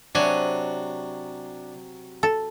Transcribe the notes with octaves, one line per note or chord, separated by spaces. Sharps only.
C3 F#3 D4 G#5
A4